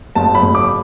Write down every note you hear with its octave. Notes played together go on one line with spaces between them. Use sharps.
F#1 A5
B5
F#1
D6